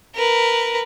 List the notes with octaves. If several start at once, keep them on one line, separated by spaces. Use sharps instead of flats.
A#4 B4